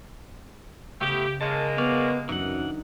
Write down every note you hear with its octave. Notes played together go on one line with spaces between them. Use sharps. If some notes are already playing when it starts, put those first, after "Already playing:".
C#3 A3 B3 E4 G4
G#3 A#3 A#4 C#5 A5
G3 B3 C#5 D5 F5
F#2 E3 F#3 D4 D#4 F#5